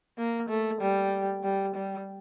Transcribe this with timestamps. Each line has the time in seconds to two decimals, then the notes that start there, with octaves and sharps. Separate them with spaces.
0.18 A#3
0.49 A3
0.81 G3
1.43 G3
1.75 G3